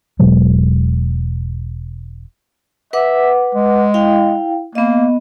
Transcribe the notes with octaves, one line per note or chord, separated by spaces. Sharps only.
E1 B2 F#3 G#3
B4 E5 F#5 D6
G#3
E4 F5 G5
A#3 B3 D#5